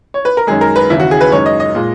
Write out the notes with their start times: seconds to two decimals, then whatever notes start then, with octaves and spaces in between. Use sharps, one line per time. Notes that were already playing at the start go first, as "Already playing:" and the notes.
0.14 C#5
0.25 B4
0.37 A#4
0.47 F#2 D#3 G#3 G#4
0.61 A#4
0.76 B4
0.90 D#2 C#3 E3 E4
1.00 F#4
1.11 G#4
1.21 B4
1.31 F#2 D#3 G#3 C#5
1.46 D#5
1.60 D#5
1.75 A#2 G#3